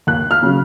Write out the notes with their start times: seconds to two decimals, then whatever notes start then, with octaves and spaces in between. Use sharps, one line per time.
0.07 D#2 F#6
0.31 F6
0.43 C#3 F#3